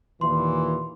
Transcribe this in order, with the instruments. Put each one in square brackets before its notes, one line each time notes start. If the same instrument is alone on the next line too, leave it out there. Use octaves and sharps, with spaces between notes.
[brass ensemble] D#2 A#2 E3 [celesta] C6